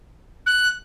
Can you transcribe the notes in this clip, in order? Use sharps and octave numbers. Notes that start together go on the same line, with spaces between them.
F#6